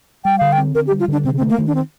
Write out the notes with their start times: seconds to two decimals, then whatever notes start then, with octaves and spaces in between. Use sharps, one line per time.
0.25 G3 G5
0.38 D3 F5
0.52 G5
0.58 C4
0.75 D3 A#4
0.87 G4
0.91 G3
1.00 F4
1.08 D3 D4
1.25 C3 C4
1.37 C4
1.41 A3
1.49 A#3
1.58 D#3
1.67 D4
1.75 C4